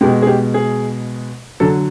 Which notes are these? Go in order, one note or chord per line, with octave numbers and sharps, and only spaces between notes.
B2 G#3 G4
G#4
G4
G#4
D3 F#3 A4